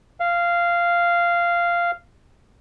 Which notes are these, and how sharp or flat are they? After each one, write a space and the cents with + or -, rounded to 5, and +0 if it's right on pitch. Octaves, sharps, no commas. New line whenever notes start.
F5 -10